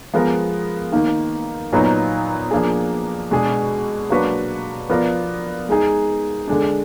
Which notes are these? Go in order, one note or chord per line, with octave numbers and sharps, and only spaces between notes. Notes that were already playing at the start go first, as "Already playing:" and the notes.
F3 G#3 B3 F4 A#4
D#3 A#3 D#4
A#2 F#3 B3 D#4
F3 A#3 D4 G#4
B2 G#3 D4 G#4
F#3 A#3 D4 F#4 B4
F3 B3 F4 A#4 D5
G#3 D#4 G#4
D3 G#3 D4